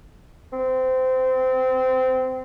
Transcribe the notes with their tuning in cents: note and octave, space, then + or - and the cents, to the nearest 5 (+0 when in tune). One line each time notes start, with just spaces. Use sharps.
C4 -20